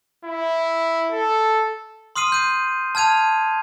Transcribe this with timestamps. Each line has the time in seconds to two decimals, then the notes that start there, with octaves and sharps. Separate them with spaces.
0.25 E4
1.12 A4
2.16 C6 D#6 F6 C7 D#7
2.32 G6 D#7
2.95 A5 F6 G#6 D#7 F7